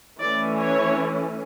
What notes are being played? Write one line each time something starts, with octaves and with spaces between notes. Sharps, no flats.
E3 A3 C#4 D5
C#5